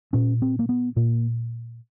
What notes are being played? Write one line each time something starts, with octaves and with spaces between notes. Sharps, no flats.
A#2 C#4
C4
A#3
B3
A#2 A#3